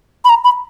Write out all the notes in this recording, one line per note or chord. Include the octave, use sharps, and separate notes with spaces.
B5
A#5
B5